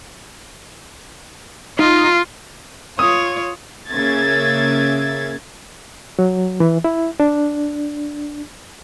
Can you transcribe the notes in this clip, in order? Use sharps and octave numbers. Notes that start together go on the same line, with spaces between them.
D#4 F4
F4 C#5 D#6
C#3 A#3 C#4 E5 G#6 A6
F#3
E3
E4
D4